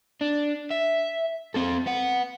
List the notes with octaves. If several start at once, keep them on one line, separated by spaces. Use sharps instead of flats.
D4
E5
C4 A4
B3 F#5